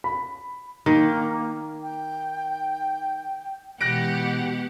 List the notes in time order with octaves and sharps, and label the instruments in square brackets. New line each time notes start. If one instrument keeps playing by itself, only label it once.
[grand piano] B5
[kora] D#3 [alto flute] A#3
[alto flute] G5
[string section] B2 G4 F#5 [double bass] E3 G#3 [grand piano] F#6 A#6 D7